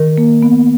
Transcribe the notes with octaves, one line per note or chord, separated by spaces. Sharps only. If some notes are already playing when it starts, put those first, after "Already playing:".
Already playing: D#3 A#4
A#3
B3